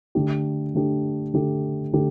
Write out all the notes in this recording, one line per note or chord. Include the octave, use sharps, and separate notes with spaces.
D3 A3 D4 G4
D3 A3 D4 G4
D3 A3 D4 G4
D3 A3 D4 G4